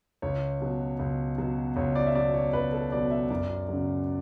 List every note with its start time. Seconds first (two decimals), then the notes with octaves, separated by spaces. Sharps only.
0.22 C#2 C#5
0.61 B2 F#3
0.99 C#2
1.38 B2 F#3
1.76 C#2 C#5
1.95 D5
2.07 E5
2.15 B2 F#3 D5
2.34 C#5
2.53 C#2 B4
2.73 A4
2.92 B2 F#3 D5
3.11 E5
3.30 F#2 D5
3.69 C#3 F#3